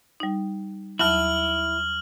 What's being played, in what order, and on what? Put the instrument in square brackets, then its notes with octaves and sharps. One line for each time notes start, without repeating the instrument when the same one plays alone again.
[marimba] G3 D#4
[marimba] D#2 F#3 A5 [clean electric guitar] E4 [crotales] F6 F#7